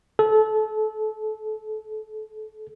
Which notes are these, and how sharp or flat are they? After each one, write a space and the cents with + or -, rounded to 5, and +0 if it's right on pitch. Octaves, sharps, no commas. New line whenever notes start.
A4 -25